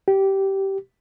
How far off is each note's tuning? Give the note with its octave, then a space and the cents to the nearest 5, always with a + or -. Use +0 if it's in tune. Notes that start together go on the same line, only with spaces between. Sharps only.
G4 -15